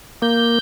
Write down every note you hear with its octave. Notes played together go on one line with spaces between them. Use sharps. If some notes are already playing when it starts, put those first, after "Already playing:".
A#3 G6